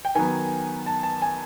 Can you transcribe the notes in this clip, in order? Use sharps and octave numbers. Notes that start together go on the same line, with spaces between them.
G5
D#3 F#3 B3 G#5
A5
A5
G#5